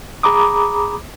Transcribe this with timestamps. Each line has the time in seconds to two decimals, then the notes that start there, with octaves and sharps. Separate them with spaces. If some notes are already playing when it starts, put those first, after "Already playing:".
0.23 G#4 A#5 B5 D6 D#6